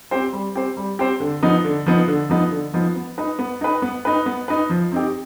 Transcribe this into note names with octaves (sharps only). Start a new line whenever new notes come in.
C4 G4 C5
G3
C4 G4 C5
G3
C4 G4 C5
D3
F3 B3 D#4
D3
F3 B3 D#4
D3
F3 B3 D#4
D3
F3 B3 D#4
B3
D#4 B4
B3
D#4 B4
B3
D#4 B4
B3
D#4 B4
F3
C4 D#4 G4